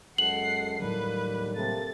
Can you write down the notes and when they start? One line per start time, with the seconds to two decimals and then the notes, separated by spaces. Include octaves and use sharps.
0.18 F#2 G#3 A4 F#5 C7 F#7
0.80 D#2 A2 D3 F#3 G3 A#3 B4
1.56 C3 A#3 A4 A6